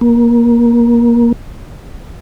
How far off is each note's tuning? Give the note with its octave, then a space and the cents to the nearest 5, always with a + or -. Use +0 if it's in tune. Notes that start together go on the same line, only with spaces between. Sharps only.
A#3 +20